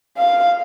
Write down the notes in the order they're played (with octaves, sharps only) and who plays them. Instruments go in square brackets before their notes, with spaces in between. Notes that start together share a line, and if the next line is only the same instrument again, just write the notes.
[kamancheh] F5